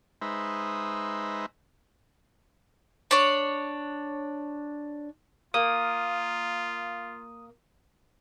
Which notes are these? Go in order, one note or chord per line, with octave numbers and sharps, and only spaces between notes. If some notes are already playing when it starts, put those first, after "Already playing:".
G#3 D#4 B4 C5 E5
D4 C#5
A#3 F4 D#6